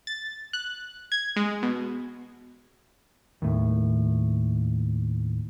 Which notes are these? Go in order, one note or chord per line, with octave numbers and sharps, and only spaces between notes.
A6
F#6
G#6
G#3
B2
D#2 A2